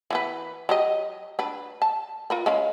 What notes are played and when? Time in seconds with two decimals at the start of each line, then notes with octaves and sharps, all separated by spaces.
0.10 E3 B3 B4
0.69 F#3 G4 D#5
1.39 D4 B4
1.82 A5
2.30 F4 A#4 B4
2.46 G#3 C#4 F5